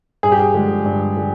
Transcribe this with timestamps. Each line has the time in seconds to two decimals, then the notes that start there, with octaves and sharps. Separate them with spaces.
0.23 G2 G#4
0.32 G4
0.40 G#4
0.54 D3 F3 G#3
0.86 G2
1.16 D3 F3 G#3